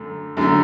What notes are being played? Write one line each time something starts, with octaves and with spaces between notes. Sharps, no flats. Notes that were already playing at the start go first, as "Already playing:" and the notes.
Already playing: F#2 D3 A3
F#2 D3 F#3 A3